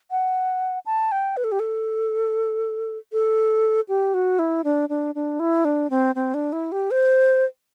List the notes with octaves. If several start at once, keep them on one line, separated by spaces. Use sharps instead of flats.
F#5
A5
G5
B4
A4
G4
A4
A4
G4
F#4
E4
D4
D4
D4
E4
D4
C4
C4
D4
E4
G4
C5